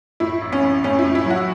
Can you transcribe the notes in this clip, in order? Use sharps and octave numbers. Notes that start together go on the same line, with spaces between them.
A2 E4
A1
C#4
A1
A2 C#4
E4
A2
E4
F#3
F#4